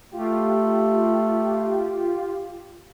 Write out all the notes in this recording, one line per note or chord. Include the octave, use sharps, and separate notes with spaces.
A3 F4 G4